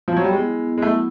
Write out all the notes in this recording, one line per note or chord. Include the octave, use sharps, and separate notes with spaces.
F3
F#3
G3
F#3 G#3 B3 E4
G#3
F#3 A3 B3 E4